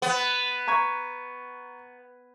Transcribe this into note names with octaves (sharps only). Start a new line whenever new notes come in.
B3
A#5 C#6 G#6